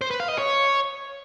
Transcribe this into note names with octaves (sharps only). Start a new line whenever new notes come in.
C5
B4
F5
D#5
C#5